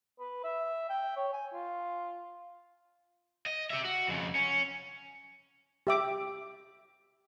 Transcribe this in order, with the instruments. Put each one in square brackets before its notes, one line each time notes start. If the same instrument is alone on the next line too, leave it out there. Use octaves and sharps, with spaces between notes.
[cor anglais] B4
E5
G5
C#5
G#5
F4
[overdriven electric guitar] D#5
G4 E5
F#4
F2 C#3
C#4
[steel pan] G4 E5 D6